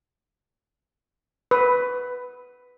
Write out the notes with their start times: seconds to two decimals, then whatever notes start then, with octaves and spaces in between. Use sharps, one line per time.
1.51 B4